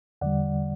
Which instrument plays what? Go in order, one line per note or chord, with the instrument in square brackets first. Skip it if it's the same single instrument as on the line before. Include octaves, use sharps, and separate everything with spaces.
[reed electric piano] E2 D3 G3 D5 F#5